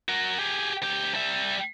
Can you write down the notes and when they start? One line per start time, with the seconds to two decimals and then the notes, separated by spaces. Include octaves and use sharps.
0.09 F#4 A#4
0.39 G4 G#4
0.82 D2 G4
1.14 G3 E5